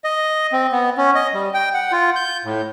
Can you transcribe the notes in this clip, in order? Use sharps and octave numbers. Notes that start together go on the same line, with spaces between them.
D#5
C4
B3
C#4
D#5
G3
G5
F#5
F4
G6
A2